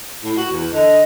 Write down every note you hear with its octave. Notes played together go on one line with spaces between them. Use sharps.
A2
F#4
E2
D3 D#5